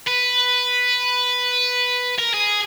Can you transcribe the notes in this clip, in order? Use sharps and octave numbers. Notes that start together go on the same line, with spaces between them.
B4
A#4
G#4